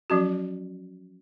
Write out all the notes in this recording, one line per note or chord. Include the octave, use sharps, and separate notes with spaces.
F3 F#3 C#4 F#4